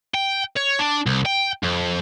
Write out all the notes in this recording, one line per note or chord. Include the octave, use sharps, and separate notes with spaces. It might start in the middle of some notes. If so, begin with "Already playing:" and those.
G5
C#5
D4
C2
G5
F2